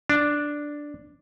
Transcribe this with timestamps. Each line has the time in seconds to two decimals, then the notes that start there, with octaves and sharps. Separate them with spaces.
0.09 D4